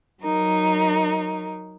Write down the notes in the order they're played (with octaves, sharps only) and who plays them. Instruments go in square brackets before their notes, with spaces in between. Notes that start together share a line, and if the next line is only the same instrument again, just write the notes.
[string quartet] F#3 D#4 A#4